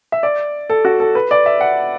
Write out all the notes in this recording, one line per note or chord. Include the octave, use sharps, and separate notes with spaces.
E5
D5
A4
F#4
A4
B4
D5
E5
F#5